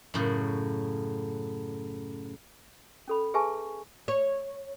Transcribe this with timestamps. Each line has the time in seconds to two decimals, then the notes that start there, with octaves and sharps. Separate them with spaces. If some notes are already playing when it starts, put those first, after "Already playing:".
0.14 F#2 A2 C#3
3.08 C#4 A4 B5
3.34 G#4 B4 E5 G#5 A5 C#6
4.08 C#5